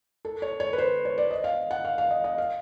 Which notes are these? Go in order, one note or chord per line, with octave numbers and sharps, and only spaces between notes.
A4
C#5
C#5
B4
C5
C#5
D5
D#5
F5
F#5
F5
F5
D#5
D#5
F5